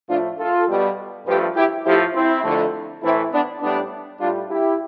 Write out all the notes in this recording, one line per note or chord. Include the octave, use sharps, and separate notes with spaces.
A2 F3 A3 D4 F4
F4 A4
B2 G3
G2 F3 A3 G4 B4
E4 G4
A2 F3 A3 E4 G4
C4 E4
F2 D3 A3
A2 E3 A3 C4 E4
B3 D4
A2 G3 B3 D4
A2 G3 D4 F4
E4 G4